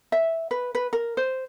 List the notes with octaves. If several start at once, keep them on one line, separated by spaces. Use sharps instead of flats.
E5
B4
B4
A#4
C5